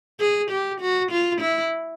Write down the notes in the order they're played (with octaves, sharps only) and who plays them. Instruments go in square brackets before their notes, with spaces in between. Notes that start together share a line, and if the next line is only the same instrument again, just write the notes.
[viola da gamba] G#4
G4
F#4
F4
E4